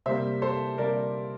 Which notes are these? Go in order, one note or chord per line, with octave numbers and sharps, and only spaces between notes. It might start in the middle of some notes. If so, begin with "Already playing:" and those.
C3 G3 A#3 C5 E5
A4 C5
C3 G3 A#3 A#4 D5